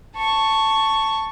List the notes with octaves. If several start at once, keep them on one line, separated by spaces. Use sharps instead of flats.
A5 C#6